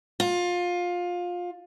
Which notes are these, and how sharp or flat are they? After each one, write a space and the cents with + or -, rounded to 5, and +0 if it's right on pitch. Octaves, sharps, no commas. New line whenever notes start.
F4 +20